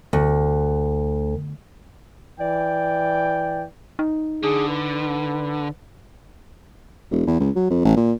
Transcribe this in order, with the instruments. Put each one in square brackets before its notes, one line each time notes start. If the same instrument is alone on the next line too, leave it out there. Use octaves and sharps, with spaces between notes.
[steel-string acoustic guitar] D2
[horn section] E3 D5 G5
[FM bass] D#4
[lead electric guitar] D3 [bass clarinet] G#4
[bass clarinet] B4
[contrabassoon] E1
E2
C#2
F#3
F2
A1
A#2